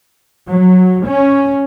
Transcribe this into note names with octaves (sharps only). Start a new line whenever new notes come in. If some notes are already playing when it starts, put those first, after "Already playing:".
F#3
C#4